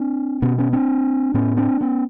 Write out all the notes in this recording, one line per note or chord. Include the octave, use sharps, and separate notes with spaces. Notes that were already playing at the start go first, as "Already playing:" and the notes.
Already playing: C4 D4
B2 B3 C#4
B3 C#4
C4 D4
A2 B3 C#4
C4 D4
B3 C#4